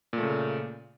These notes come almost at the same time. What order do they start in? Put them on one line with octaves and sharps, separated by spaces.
A#2 A3 C#3